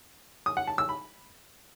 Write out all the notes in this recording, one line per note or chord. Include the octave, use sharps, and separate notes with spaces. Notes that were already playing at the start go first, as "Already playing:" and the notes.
D#6
F#5
A5
E6
B5